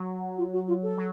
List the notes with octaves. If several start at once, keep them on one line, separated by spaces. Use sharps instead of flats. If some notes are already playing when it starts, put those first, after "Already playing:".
Already playing: F#3
F4
F#4
F4
A4
F#3